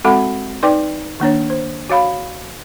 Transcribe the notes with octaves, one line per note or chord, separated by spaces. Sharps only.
G#3 C4 F#4 A4 F#5 B5
D#4 B4 D5 G5 D6
D#3 A#3 D4 C#5
C5
F#4 C#5 F5 B5